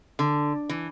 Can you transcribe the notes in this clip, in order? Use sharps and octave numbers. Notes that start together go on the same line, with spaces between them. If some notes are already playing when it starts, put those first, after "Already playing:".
D3
E3